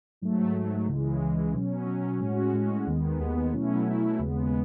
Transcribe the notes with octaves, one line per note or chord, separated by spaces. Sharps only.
G#2 F#3 A3
G#2 F#3 A3
C#2 C#3 E3 G#3
C#2 C#3 E3 G#3
B2 F#3 C#4
B2 F#3 C#4
A2 G#3 C#4 F#4
A2 G#3 C#4 F#4
D#2 D#3 G#3 B3
D#2 D#3 G#3 B3
B2 F#3 A3 C#4 E4
B2 F#3 A3 C#4 E4
D#2 C#3 G#3 B3